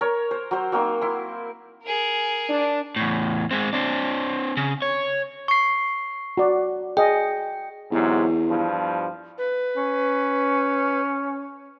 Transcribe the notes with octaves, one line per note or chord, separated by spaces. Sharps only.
A#4 C#5
C5
F#3 C5
F#3 A#3 C4 D#4
E4 C6
G#4 A#4
D4
E2 A2
G#3 C4
C4 D4
C#3
C#5
C#6 C7
F#4 D5
G#4 D#5 G5
E2 G#2 C3 F#3
G2 F3
B4
C#4